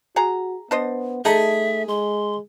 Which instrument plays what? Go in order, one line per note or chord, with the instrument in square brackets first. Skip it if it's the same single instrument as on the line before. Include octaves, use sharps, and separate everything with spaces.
[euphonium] F#4 [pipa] G#4 F#5 A#5
[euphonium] B3 [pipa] D4 C5 D#5
[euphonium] A3 [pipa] D#4 A4 [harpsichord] G#4 B5 [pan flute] E5
[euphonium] G#3 [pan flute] C6